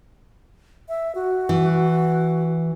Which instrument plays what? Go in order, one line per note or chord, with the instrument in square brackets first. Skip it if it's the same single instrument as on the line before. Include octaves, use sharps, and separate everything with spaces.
[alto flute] E5
F#4
[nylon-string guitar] E3